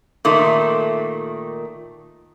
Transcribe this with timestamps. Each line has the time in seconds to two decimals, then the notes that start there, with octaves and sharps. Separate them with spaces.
0.25 A#2 D#3 A3